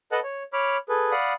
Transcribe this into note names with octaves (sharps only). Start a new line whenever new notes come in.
A4 B4 D#5 F#5 A5 F#6
C#5
C#5 B5 D6 F6
G#4 A4 B4
D5 F5 F#5 B5 D#6